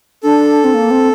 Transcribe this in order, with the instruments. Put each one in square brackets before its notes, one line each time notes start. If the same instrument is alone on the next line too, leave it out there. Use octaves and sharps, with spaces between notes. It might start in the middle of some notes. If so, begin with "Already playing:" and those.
[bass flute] D4 [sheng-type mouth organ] A4
[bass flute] C4
A#3
C4